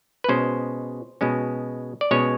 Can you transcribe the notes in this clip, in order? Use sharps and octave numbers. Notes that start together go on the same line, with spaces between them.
B4
B2 G#3 C#4 C5
B2 G#3 C#4
D5
B2 G#3 C#4 C#5